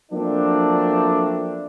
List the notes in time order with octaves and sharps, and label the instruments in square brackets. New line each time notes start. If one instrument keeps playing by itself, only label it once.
[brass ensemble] F3 F#3 A3 A#3 C4 D4